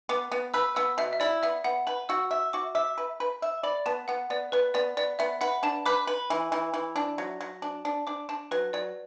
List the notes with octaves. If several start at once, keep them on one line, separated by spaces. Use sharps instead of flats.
B3 D6
B3
B4 E6
B3 E6
B2 E5
E5
E4 D5
B3 E5
B3 F#5
B4 B5
F#4 E6
E5 E6
F#4 D6
E5 D6
B4
B4
E5
D5 B5
B3 A5
B3 F#5
B3 D5
B3 B4
B3 D5
B3 D5
B3 E5
B4 F#5
D4 A5
B4 D6
B4 B5
E3
E3
E3
D4
F#3
F#3
D4
D4
D4 D6
D4 A5
F#3 B4
F#3 D5